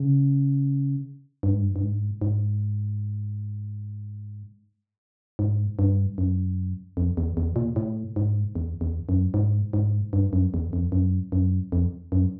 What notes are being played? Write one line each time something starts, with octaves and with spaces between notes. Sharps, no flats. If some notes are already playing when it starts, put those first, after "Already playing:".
Already playing: C#3
G2
G#2
G2
G2
G#2
G#2
G#2
G2
F#2
F2
E2
E2
A#2
A2
G#2
E2
E2
F#2
G#2
G#2
G2
F#2
E2
F2
F#2
F#2
F2
F#2